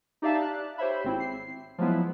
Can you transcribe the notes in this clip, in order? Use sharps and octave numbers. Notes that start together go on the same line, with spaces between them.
D#4 G4 D5 E5 F5 A5
F#6
G4 C5 C#5 E5 B5
G#1 C4 E4
C7
F3 F#3 G#3 B3 E4